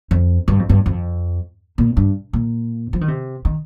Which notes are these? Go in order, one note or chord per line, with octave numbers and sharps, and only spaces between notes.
F2
G2
F2
G2
F2
A#2
G2
A#2
F3
D#3
C3
D#3